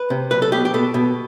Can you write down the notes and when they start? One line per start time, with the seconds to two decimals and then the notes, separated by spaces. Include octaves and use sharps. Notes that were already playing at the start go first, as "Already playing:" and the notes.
Already playing: B4
0.10 C3
0.31 B1 B4
0.42 A4
0.52 B2 G4
0.65 G4
0.74 B2 A4
0.94 B2